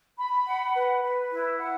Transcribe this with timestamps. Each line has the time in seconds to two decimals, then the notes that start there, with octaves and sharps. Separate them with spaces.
0.18 B5
0.47 F#5
0.75 B4
1.03 B4
1.32 E4
1.60 F#5